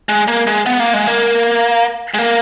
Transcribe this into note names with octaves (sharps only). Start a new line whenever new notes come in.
G#3
A#3
G#3
B3
A#3
G#3
A#3
G#3
A#3